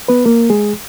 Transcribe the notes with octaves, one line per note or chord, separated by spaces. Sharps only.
B3 B4
A#3 A#4
G#3 G#4